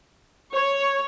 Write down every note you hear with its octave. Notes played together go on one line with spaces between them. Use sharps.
C#5